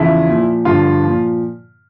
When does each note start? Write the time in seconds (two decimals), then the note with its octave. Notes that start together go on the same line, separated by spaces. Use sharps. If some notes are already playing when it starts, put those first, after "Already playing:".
Already playing: E2 C#3 F3 E4
0.29 A#2 F3
0.65 G2 D3 F3 F4
1.03 A#2 F3